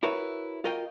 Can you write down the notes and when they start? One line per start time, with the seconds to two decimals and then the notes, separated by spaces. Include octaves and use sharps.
0.03 E4 F#4 A#4 B4 C#5 E5
0.64 F4 F#4 A#4 D#5 F5 G5